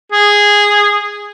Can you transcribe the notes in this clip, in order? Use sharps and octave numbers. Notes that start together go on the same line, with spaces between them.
G#4